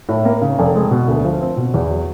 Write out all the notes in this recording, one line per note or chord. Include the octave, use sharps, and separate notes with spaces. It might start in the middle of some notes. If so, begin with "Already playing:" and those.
A2
A#3
C#3
F1
G#3
B2
D2
F3
C4
B2
E2
F#3